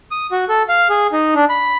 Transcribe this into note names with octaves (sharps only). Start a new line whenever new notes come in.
D#6
F#4
A4
F5
G#4
D#4
D4
B5